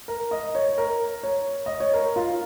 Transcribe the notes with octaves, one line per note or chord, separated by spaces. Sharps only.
A#4
D#5
C#5
A#4
C#5
D#5
C#5
A#4
F4